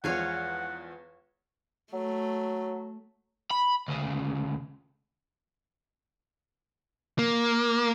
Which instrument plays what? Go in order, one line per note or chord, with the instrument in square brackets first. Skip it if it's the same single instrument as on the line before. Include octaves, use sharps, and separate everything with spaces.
[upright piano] E2 F3 G#3 [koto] C#5 F5 G#5 [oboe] F#5
[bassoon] F#3 [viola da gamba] A3
[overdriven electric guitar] B5
D2 C#3
[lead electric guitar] A#3